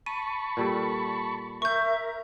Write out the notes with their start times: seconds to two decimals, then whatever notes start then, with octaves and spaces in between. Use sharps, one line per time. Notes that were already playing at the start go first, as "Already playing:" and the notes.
0.06 A5 B5 C#6 D#7
0.57 A#2 G3 A4
1.62 A#4 E5 C#6 G6